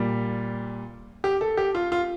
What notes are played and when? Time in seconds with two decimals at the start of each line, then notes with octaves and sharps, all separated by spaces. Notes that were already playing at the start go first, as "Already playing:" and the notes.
Already playing: A#2 G3
1.24 G4
1.41 A4
1.57 G4
1.75 F4
1.92 F4